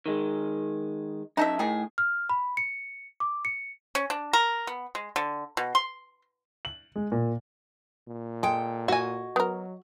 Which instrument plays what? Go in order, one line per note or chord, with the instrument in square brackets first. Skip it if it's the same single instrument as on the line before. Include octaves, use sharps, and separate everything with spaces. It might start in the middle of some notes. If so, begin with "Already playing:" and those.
[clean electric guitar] D#3 G#3
[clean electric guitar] F#2 A5 [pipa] D#4 D#5 E5
[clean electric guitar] A2 [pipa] D#3 G#4
[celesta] F6
B5
C#7
D6
C#7
[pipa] C#4
D4
A#4
B3
G#3
D3
B2
C6
[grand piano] F#7
G#3
A#2
[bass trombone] A#2
[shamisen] G#3 [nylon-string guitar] A4 G5
[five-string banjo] F#4 G#5 [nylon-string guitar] D#5
[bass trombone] F#3 [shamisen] B3 A#4